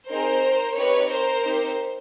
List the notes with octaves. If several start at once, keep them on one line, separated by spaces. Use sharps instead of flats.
C4 D#4 G#4 A#4 C5
C4 D#4 G4 B4 C#5
A#4 C5
C4 D#4 G4